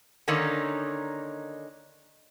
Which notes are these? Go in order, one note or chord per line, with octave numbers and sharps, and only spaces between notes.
D3 D#3 A#3 C#4 D#4